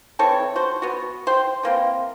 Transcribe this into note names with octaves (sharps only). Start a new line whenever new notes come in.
E3 C4 A4 C#5
F#4 C5
B3 F#4
C5 G5
E3 A#3 C4